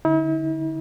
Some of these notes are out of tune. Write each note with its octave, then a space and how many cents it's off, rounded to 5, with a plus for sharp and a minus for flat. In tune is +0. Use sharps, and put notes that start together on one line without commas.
D3 +0 E4 -45